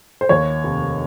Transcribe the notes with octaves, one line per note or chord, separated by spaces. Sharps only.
C5
D#2 C#5
F1